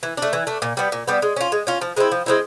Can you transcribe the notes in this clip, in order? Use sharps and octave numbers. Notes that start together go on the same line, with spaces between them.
E3
A3 D4
E3
A3 D4
A#2
G3 B3
A#2
G3 B3
G#3
C#4 F4
G#3
C#4 F4
F3
G#3 C4 E4
F3
G#3 C4 E4